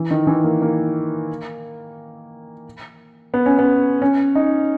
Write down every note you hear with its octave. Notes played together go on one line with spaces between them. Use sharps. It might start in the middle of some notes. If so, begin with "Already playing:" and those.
Already playing: E3
D#3
E3
A#3
A#3
B3
C#4
B3
C#4
D#4